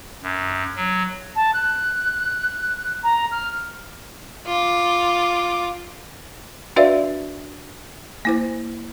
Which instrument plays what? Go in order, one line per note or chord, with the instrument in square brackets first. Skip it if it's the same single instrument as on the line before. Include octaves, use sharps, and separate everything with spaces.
[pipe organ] F#2
F#3
[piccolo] A5
F#6
A#5
F6
[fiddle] F4 D6
[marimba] D4 F#4 B4 D5 E5 F5
A#3 E4 C5